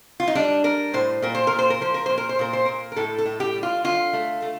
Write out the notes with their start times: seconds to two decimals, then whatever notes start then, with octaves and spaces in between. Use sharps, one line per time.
0.20 F4
0.28 D#4
0.35 G3 D4
0.64 G3 A#4
0.94 A2 C5
1.22 A#2 A#4
1.35 C5
1.47 A#4
1.52 A#2
1.59 C5
1.70 A#4
1.81 F3 C5
1.94 A#4
2.06 A#2 C5
2.18 A#4
2.29 C5
2.39 A#2 A#4
2.53 C5
2.65 A#2 A#4
2.92 A#4
2.96 A2 A4
3.18 A4
3.26 A2
3.40 G4
3.56 G3
3.63 F4
3.84 D3 F4
4.13 A3
4.42 A3